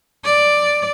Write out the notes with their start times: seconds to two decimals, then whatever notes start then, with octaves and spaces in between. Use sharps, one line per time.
0.25 D5